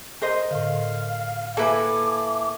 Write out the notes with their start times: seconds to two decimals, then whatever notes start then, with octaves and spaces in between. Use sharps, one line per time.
0.22 A#4 C5 D#5
0.51 A2 D3 F5
1.57 A#3 E4 A4 B4 G#5 D6